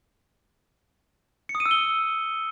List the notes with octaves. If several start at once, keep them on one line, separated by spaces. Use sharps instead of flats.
C#7
D#6
D#7
E6
G7